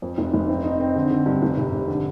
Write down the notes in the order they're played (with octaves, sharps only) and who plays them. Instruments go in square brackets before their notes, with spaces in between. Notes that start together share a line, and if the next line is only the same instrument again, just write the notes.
[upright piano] F2
F1
F1
C4
D#4
C4
D3
D3
G2
F1
C3
C3
D3